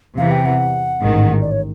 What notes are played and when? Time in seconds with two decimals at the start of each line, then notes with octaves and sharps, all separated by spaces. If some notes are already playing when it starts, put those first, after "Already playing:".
0.18 E2 C3 E3 F5
0.31 G5
0.46 F#5
1.00 A1 G#2 D#3
1.41 D5
1.51 C#5